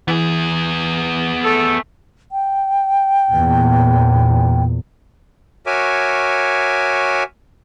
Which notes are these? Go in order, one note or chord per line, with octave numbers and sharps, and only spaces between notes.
E3 B3 G#4
A3 A4
G5
E2 A#2
F#4 A#4 C#5 E5 G#5 D6